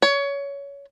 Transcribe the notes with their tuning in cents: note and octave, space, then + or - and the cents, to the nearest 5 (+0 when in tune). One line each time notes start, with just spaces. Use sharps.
C#5 +20